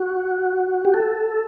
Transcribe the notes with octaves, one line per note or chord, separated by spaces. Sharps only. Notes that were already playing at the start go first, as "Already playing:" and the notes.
Already playing: F#4
G4
A4